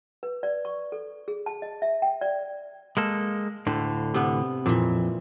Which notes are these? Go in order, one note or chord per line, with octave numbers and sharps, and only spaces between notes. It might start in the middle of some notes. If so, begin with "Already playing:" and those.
B4
D5
C#6
A4
G#4
A5
D#5
E5
G5
D5
G#3 A#3 A4
D2 A2 D3 C5
C3 B3
F2 A#2 E3